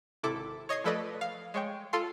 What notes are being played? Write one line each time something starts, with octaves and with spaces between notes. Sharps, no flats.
G#1 C3 E4 A4 D6
C#5 D#5 G#6 C7
F3 A3 A4 B4 D5 D#5
F5
G#3 C#5 G5
F4 A4 F5 C6